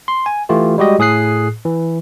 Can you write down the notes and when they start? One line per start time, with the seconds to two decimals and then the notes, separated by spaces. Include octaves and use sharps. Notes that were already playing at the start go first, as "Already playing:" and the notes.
0.08 C6
0.26 G#5
0.49 E3 A3 F4 G4
0.78 G3 G#3 F#4 G4 D#5
0.99 A2 G#4 D#6 F#6 C7
1.65 E3